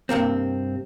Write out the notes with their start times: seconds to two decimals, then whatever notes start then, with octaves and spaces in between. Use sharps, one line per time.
0.09 G2 C3 A#3 C4